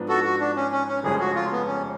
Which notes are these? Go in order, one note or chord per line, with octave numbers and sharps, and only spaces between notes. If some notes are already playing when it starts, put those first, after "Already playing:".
Already playing: G#2 F3 B3 D4
F#4 A4
F#4
D4
C#4
C#4
C#4
F1 F2 C#3 G#3 C#4 G#4
F#4
F4
B3
C#4